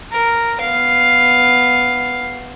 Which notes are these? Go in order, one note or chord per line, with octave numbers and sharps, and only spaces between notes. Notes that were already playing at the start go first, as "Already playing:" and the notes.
A#4
B3 F5